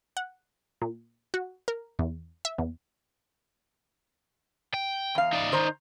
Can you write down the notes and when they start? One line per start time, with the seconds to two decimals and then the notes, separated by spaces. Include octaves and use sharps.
0.17 F#5
0.82 A#2
1.34 F#4
1.68 A#4
1.99 E2
2.45 E5
2.58 E2
4.74 G5
5.15 E2 F5
5.33 D#4 D5
5.52 D#3 C5 A#5